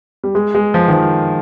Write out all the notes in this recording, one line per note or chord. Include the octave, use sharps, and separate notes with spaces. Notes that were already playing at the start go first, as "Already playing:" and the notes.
G3
G#3
G#3
F3
D#3
F3